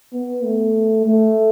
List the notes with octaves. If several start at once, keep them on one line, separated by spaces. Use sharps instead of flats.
B3
A3
A3